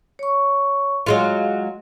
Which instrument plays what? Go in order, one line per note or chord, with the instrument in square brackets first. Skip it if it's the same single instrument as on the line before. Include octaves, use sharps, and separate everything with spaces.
[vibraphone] C#5 C#6
[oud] F#3 G#3 F4 [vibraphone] F5